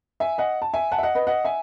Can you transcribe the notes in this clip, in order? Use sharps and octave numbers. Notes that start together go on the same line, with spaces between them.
E5 G#5
D#5 F#5
A5
E5 G#5
F#5 A5
E5
D#5 F#5
B4 D#5
D#5 F#5
E5 G#5